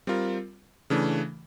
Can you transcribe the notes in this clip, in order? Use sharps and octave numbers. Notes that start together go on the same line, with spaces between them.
G3 C4 F4 A#4
C#3 E3 A3 D4